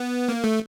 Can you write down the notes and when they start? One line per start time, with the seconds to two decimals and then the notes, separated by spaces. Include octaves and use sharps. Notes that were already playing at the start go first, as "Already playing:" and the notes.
Already playing: B3
0.29 A#3
0.44 A3